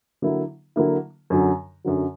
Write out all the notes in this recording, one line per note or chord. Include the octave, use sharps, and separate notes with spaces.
D3 F#3 A#3 E4
D3 F#3 A#3 E4
F#2 D3 F#3
F#2 D3 F#3